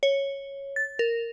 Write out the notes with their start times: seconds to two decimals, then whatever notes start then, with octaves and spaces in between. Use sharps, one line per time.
0.03 C#5
0.76 A6
0.99 A#4